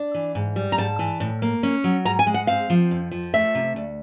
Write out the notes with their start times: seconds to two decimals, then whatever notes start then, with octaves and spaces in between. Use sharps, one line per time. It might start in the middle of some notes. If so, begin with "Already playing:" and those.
Already playing: D4
0.15 E3
0.35 G#2
0.56 G3
0.72 A#5
0.78 G#2 A5
0.99 E3
1.20 A2
1.42 A#3
1.63 C#4
1.84 F#3
2.05 G#2 A#5
2.19 G#5
2.27 G#3
2.34 F#5
2.47 C4 F5
2.70 F3
2.91 F2
3.12 F3
3.33 A3 E5
3.55 C3
3.76 D2